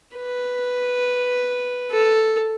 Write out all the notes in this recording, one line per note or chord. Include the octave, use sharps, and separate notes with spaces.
B4
A4